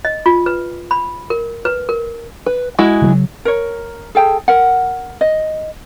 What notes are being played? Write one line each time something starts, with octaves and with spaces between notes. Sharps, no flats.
D#5
F4
B4
B5
A#4
B4
A#4
B4
G#3 E4 F#4
C#3 F3 F#3
A#4 C#5
G#4 A4 G5
A#4 F#5
D#5